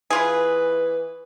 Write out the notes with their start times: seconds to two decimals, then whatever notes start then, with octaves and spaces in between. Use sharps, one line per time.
0.10 E3 E4 F4 G#4 B4